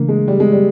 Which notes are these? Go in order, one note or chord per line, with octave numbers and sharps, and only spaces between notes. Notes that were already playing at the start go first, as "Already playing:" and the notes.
Already playing: C#3 E3 A3 A#3 D4
G#3
G3
G#3
G3